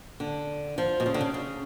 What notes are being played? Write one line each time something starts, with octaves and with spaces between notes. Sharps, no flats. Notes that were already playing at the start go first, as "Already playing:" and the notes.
D3
F3
B2
C#3
D3
C#3
C#3